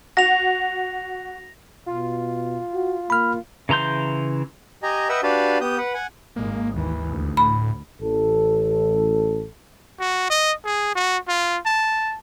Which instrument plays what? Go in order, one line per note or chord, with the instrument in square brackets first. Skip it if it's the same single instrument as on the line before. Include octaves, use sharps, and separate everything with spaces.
[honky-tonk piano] F#4 [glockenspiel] A#6 F7
[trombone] B2 [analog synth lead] F4
[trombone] F#4
[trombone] A#3 [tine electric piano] B5 F6
[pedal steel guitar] C#3 E3 A#5 C6 G6
[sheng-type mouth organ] G4 D#5 G#5 A#5
B4 D#5 E5 F#5 G5 E6
D4 F#4 G4 B4 F5 A5
B3 G4 D#6 G6
B4 F#5
F#5 G#5
[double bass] G#1 G#3 [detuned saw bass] A#3
[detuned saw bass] D#2 [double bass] E3
[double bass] D2
[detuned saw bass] A2 [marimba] B5
[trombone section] A1 A4
[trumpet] F#4
D#5
G#4
F#4
F4
A5